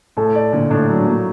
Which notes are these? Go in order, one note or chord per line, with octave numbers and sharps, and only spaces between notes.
A2 A4
D5
A#2 D3
A2 D4
F#3
A#3